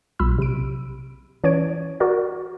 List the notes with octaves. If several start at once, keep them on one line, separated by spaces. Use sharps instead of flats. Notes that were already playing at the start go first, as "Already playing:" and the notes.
B1 A#2 B5 E6
C3 D7
E3 C#4 C#5 D5 G#6 D7
F#4 A#4 D5